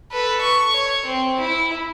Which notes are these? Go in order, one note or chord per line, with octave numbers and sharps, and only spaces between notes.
A4 B4
C#6
C#5
C4
E4